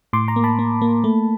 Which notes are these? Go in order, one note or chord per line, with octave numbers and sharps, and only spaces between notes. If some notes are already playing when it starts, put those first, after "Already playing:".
A2 C6 D6
A#5 C6
A#3
A5 B5
A#3
A#3
A3